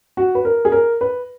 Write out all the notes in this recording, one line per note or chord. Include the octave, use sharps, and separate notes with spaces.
F#4
B4
A#4
G#4
A#4
B4